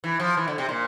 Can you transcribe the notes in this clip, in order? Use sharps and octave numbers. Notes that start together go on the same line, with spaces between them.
E3
F3
E3
D3
C3
A#2